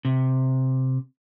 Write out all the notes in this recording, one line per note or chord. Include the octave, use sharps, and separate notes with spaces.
C3